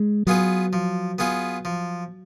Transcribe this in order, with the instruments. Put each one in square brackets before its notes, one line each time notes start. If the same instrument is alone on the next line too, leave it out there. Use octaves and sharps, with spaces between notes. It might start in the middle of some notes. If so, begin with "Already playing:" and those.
Already playing: [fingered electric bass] G#3
[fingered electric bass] F#3 [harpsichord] B3 F4 G#4 B4
[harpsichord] F3
B3 F4 G#4 B4
F3